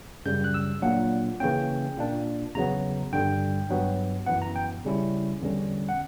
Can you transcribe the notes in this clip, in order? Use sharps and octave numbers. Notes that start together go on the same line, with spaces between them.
F#2 C#3 G3 G6
F#6
E6
A#2 F#3 A#3 D4 F#5
C#3 E3 A#3 C#4 G5
A#2 A#3 D4
E2 C#3 F#3 B3 A#5
G2 D3 G3 G5
G2 F#3 B3
F#2 E3 B3 F#5
A#5
G5
C#3 G3 C#4 E4
E2 D3 G3 C#4
F#5